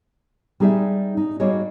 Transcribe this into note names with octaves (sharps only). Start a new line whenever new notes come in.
G3 D#4 G#4 D5 E5
D#4
G3 A#3 F#4 G#4 C#5 D#5